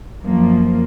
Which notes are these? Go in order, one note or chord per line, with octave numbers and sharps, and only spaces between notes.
F#2 F3 A#3